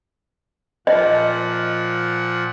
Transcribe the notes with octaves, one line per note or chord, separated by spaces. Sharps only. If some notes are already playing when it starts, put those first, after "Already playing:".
A#2 F3 D#5 F#5